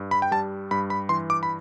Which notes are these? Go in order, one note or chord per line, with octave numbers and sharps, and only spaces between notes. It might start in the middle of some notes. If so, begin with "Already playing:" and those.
Already playing: G2
B5
G5
G3 A5
G2 B5
B5
E3 C6
D6
B5